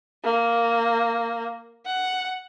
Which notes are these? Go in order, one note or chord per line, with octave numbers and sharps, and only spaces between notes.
A#3
F#5